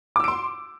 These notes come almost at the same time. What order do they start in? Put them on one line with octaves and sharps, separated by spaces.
D6 E6 D7 C6